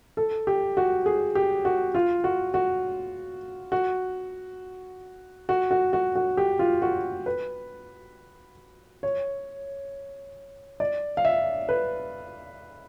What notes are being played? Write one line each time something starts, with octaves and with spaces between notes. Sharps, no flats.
A4
G4
F#4
G#4
G4
F#4
F4
F#4
F#4
F#4
F#4
F#4
F#4
F#4
G4
F4
F#4
B4
C#5
D5
F5
E5
B4